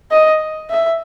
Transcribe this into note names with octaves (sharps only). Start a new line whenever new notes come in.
D#5
E5